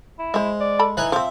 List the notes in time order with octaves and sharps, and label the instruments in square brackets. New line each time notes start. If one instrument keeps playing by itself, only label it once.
[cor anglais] E4
[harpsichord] G#3 [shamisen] C5 E5
[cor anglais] D5
[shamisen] A4 A5 B5
[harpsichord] E3 B4 G#5 [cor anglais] D#4
[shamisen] F3 C4 [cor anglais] C5 [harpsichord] E5